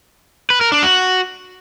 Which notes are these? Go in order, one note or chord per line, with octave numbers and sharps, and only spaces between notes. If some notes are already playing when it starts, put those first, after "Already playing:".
B4
A#4
D4
F#4